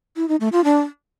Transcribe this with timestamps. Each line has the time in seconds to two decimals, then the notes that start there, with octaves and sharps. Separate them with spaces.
0.17 E4
0.28 D#4
0.40 A3
0.52 F4
0.64 D4